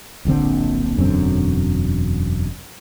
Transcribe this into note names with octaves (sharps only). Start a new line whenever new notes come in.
D1 A#1 D3 C4
E1 F#2 D3 C4